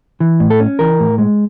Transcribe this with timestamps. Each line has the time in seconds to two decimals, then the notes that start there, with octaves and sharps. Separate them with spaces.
0.20 E3
0.40 A2
0.50 A4
0.60 C#4
0.79 E3 A#4
1.00 A2
1.18 G#3